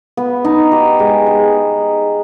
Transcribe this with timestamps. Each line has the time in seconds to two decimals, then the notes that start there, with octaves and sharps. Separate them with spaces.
0.17 B3
0.45 D#4
0.72 G4
0.99 G#3
1.26 G#3